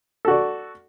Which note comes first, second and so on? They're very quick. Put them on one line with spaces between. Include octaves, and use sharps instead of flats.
A4 F#4 D5